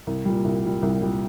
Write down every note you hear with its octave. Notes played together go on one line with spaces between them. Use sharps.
C2
A#2 G3
C2
A#2 G3
C2
A#2 G3